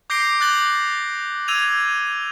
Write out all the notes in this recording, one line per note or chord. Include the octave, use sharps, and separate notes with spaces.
D6 G6 A#6 C7 D7 G7
D6 F#6 A6 F#7 G7
E6 G#6 D#7 F7